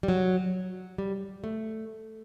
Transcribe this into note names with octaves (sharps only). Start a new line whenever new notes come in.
G3
F#3
G3
A3